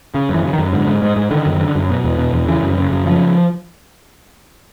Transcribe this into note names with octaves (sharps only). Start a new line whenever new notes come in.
C#3
F#2
E3
C#3
D#3
F#2
G#2 D3
G#2
G#2
G#2
D3 D#3
F#2
D3
F#2
B2
E2
B2
E2
C#3 E3
F#2
C#3
F#2
C#3 F3